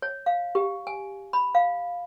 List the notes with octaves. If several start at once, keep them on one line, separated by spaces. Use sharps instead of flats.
C#5
F5
G4
G#5
B5
F5